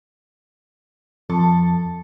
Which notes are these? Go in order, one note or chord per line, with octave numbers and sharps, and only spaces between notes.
F2 A4